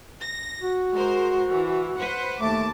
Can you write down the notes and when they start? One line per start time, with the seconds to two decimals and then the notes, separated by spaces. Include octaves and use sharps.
0.21 A#6
0.61 F#4
0.95 G#3 A#4 C5
1.52 E3
2.00 B4 C5 F#5
2.40 D#2 A3 A5 D6